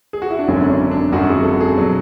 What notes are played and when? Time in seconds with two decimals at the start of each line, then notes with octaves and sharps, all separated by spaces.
0.13 G#4
0.22 F#4
0.30 E4
0.39 D4
0.48 G#1 F#2 D3 F#3 C#4
0.64 D4
0.70 C#4
0.91 D4
1.12 G#1 F#2 D3 F#3 F#4
1.29 G#4
1.44 A4
1.61 G#4
1.78 B2 F#3